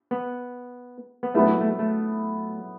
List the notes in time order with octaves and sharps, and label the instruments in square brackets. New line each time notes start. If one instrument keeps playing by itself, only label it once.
[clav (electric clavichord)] B3
B3
[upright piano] F#3 B3 E4 A4 E5 [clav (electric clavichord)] A3
[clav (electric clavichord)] A3
A3